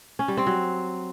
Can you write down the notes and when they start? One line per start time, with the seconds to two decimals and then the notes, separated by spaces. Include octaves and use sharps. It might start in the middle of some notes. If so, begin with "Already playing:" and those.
0.19 C#4
0.28 G3
0.37 C4
0.47 F#3